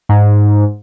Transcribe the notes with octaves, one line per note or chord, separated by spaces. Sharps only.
G#2